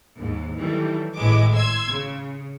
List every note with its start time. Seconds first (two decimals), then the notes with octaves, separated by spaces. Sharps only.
0.17 D#2 G#2
0.56 D#3 E3 F#3 G3 A3
1.15 G#1 A2 G#3 B4 D6
1.53 C6 E6 G#6
1.87 C#3